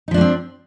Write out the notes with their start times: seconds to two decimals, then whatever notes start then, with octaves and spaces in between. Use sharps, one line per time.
0.08 D#4
0.11 F3
0.14 D4
0.18 A#3
0.21 C4